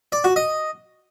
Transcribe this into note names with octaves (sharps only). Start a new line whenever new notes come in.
D5
F#4
D#5